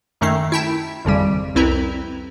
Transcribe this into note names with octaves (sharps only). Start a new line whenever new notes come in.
F#2 D#3 A3 C#4 D#4 C7
E4 G5 A5
G#1 F2 C#3 G3
C2 F2 C4 E4 B4 A#5